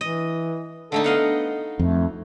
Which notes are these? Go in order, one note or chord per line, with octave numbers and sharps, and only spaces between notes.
E3 D#5
D3 A3 D#4 A4
B3 D#5 F5 F#5
F2 A3